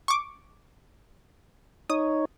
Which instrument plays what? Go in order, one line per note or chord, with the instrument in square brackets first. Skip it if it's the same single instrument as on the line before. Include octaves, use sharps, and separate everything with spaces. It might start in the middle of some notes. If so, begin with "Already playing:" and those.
[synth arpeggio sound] C#6 D6
[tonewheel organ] D#4 C#5 [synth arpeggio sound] D#6